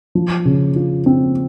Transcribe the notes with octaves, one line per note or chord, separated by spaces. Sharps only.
F3
C#3
F4
C4